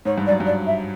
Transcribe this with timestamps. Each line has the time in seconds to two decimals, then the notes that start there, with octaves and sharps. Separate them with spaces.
0.05 G#2 C#5
0.18 G2
0.27 F#2 D5
0.40 G2
0.46 D5
0.66 E5